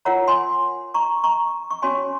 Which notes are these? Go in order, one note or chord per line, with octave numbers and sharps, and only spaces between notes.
F4 A#4 C#5 F#5 A#5
G#5 C6
A#5 C#6
A#5 C#6
C#6
C#4 F#4 C#5 G#5 C6